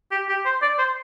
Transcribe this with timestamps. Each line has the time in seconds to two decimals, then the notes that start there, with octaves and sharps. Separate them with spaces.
0.11 G4
0.29 G4
0.45 C5
0.62 D5
0.78 C5